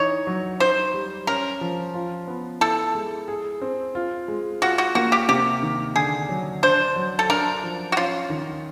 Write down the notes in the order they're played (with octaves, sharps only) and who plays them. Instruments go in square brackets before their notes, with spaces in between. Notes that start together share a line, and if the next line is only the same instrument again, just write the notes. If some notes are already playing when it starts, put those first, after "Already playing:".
Already playing: [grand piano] E3 D#4 [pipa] C#5
[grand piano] F#3
[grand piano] D#4 [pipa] C5
[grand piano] G3
[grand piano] C#4 [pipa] A#4
[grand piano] F3
F4
B3
[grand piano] E4 [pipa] A4
[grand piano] G#3
G#4
C4
F4
G#3
[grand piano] F4 [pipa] F#4
[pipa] F#4
[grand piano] A#3 [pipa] F#4
[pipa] G4
[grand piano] C3 [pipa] G4
[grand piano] D#3
[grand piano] D3 [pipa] G#4
[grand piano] F#3
[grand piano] D4 [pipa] C5
[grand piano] F#3
[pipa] A4
[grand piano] D4 [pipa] A#4
[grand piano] F3
[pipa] F#4
[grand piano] C#4 [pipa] F4
[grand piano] D#3